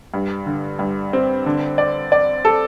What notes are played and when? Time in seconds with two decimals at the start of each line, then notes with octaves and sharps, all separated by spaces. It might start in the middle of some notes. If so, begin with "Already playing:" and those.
0.14 G2
0.46 D3
0.79 G2
1.13 C4
1.46 D3
1.78 D5
2.12 D5
2.45 A4